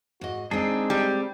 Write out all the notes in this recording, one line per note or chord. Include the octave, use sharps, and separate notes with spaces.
G#2 F#4 D#5
G#3 C4 D4 D#4 G#4
G3